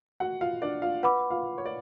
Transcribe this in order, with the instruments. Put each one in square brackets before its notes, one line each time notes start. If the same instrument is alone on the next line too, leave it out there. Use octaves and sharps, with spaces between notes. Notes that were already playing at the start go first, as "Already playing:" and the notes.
[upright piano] F#4 F#5
F4 F5
D4 D5
F4 F5
[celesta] B4 F#5 B5 D6
[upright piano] F4 F5
C#5
D5